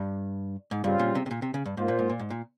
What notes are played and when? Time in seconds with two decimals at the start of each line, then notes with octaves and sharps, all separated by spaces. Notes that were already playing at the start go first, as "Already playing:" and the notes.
Already playing: G2
0.71 G#2
0.84 G2 C#3 G3 C4 F4
0.99 A#2
1.15 C3
1.26 C3
1.31 A#2
1.42 C3
1.54 C#3
1.66 G2
1.77 G#2 A#3 F4 C5
1.88 A#2
1.99 G#2
2.10 A#2
2.19 G#2
2.30 A#2